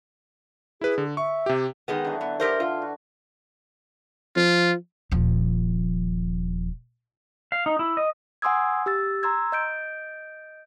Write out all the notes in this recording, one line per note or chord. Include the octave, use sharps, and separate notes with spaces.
E4 G#4 B4
D3
E5 C#6
C3 G4
D#3 G#3 B3
D3 E3 F#3
B3
E4 G4 A#4 C5
D3 F4
F#4
F3 F4
D#1 F3
F5
D#4
E4
D#5
F#5 G#5 C6 D#6 E6 G#6
G4 E6 A6
A#5 C6 E6 G#6
D#5 G6 D7